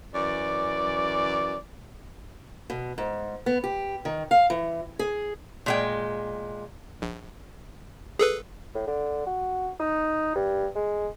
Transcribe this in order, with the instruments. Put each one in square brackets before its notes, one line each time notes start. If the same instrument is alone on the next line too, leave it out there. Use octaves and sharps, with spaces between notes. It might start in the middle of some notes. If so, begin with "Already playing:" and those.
[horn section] F#2 E3 D5
[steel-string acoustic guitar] B2
G#2
B3
G4
D#3
F5
E3
G#4
[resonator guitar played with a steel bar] A#2 G#3 G5
[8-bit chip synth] A#1
G#4 A4 B4
[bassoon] A2
D3
F#4
D#4
G2
G#3